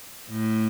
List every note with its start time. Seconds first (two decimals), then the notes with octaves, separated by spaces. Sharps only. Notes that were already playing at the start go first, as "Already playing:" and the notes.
0.29 A2